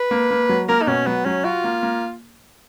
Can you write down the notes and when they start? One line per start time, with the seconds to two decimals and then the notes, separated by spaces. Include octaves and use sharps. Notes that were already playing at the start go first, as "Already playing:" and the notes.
Already playing: B4
0.11 A#3
0.31 A#3
0.49 F#3
0.69 A#3 A#4
0.82 D#4
0.87 B2 C#4
1.06 F#3 B3
1.25 F#3 C#4
1.44 F4 F#4
1.64 A#3
1.83 A#3